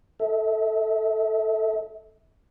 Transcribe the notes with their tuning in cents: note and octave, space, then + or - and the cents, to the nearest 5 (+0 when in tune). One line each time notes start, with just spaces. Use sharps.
A4 +0 E5 -35